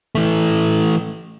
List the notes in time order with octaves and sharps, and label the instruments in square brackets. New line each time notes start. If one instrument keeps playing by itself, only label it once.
[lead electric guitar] E3 A3